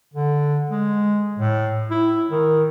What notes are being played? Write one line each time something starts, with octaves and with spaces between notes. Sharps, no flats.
D3
G#3
A2
E4
D#3